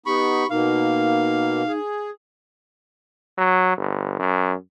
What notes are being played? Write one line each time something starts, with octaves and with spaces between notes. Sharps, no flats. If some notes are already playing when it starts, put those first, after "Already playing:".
B3 D#4 G4 B5 C#6
B2 A#3 D#4 F5
G#4
F#3
G1
F#2